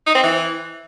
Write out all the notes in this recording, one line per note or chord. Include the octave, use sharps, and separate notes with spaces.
D#4
C4
E3